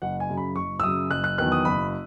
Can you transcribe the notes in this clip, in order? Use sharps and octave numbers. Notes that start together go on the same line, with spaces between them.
F#1 F#5
G#5
F#2 C#3
B5
F#1 C#6
E6
F#2 C#3 D#6
F#1 F#6
F#6
E2 D#3 F#3 B3 F#6
D#6
F#1 B5